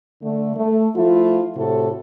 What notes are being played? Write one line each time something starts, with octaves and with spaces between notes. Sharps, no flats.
D3 A3
A3
F3 A3 E4 F4
A2 C3 E4 F#4 A4